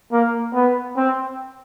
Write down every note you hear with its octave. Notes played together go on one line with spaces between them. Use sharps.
A#3
B3
C4